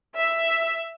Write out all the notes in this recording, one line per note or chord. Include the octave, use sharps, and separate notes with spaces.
E5